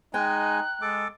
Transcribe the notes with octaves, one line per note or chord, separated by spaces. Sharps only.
G#3 D#4 G5 G#5 A#5 F#6
G#3 A4 D6